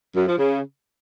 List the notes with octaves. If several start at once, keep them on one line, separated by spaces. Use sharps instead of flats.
F#2
F3
C#3